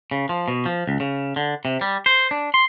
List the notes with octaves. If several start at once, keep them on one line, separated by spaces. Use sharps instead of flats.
C#3
F3
B2
F3
C#2
C#3
D3
C3
G3
C5
D4
C6